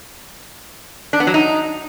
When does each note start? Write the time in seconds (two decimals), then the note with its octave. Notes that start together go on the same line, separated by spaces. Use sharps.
1.13 D4
1.20 B3
1.27 F#3
1.34 D#4